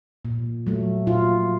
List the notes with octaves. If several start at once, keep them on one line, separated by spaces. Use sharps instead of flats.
A#2
F#3 A3
A#2 F4